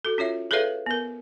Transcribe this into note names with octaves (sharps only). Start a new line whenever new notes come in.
F#4 A4
C#4 F4 C#5 E5
G#4 A4 B4 C#5 E5 F5
B3 A#4